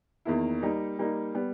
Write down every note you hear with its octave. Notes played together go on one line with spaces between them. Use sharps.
E2 D#3 A#3 E4
G3 A#3 D#4
G3 A#3 D#4
G3 B3